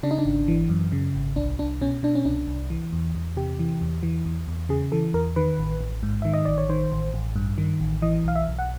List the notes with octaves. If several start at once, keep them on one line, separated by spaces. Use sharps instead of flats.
C#3 D4
D#4
D4
G#1
E3
F#2
C#3
G#1
C2 D4
C2 D4
B2 C#4
B2 D4
C#4
C2 D4
C2
E3
E2
E2
C3 G4
E3
E2
E3
E2
E2
C#3 G#4
E3 A4
E2 A#4
D#3 B4
A1
A1
G#2
D#3 E5
D#5
A1 D5
C#5
D#3 C5
A1
A1
G2
D#3
A1
E3 D#5
B1 F5
E5
B1
F#5